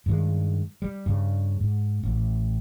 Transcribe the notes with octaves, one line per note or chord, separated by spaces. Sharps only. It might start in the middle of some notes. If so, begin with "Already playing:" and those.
G2 D#3 G#3
G3
G2 C#3
G#2
A1